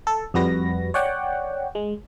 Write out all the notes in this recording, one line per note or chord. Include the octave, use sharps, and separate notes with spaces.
A4
F2 G3 F#4 B4 A#6
C#5 D5 F#5 G5
G#3